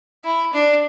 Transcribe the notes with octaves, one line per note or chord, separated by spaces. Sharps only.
E4
D4